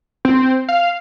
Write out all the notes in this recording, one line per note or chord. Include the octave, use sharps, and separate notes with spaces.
C4
F5